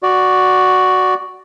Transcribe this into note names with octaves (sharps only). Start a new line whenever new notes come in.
F#4 D5